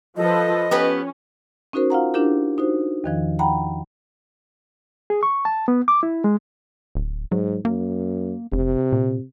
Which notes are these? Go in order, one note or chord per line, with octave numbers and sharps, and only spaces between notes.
F3 A4 B4 D#5
B3 C#4 G4 B4
C#4 D#4 F#4 A#4 C5
F4 F5 F#5 A#5
D4 E4 F4 G4 A#4
D#4 F#4 C5
E2 D#3 F3
F#5 G5 A#5 B5
G#4
C#6
A5
B3
D6
E4
G#3
D1
G#2 F#3
F#2 A#3
F1 C3
A#2